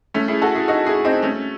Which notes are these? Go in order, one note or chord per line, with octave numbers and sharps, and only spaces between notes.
A3 C#4
E4 G#4
F#4 A4
E4 G#4
D#4 F#4
E4 G#4
C4 D#4
A3 C#4